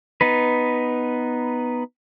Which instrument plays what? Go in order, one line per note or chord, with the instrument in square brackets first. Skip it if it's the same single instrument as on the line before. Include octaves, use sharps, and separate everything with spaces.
[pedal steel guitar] B3 D#4 B4